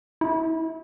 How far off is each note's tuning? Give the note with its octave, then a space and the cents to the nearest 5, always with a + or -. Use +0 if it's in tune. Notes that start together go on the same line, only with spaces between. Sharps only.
E4 -30